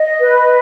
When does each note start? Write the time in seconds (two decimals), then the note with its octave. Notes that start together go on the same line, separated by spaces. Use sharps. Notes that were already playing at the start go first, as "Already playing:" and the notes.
Already playing: D#5
0.20 B4